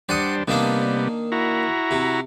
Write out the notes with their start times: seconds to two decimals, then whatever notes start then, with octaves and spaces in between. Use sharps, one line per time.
0.09 G3 D4 C5 D5 F#5 D#6
0.48 C3 D#3 G3 A#3 B3 D4
1.32 E4 F#4 A#5
1.91 C3